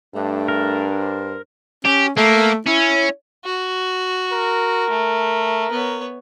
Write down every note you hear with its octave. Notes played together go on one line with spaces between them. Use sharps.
G2 A3 D4
A#4
C5
C#4 G4
A3 A#3
C#4 E4
F#4
A#4
A3
B3 C#5